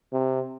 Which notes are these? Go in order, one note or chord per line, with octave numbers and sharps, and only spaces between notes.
C3